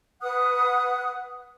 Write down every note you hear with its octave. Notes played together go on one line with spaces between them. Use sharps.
B4 F#5 D#6 F#6